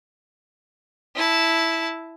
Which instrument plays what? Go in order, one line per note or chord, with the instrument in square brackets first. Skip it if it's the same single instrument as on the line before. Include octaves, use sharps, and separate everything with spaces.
[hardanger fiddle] E4 A5